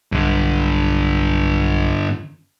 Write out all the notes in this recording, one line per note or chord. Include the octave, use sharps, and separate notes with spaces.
B1 G2 D3